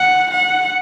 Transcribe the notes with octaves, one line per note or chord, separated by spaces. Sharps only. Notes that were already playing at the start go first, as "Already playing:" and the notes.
Already playing: F#5
F#5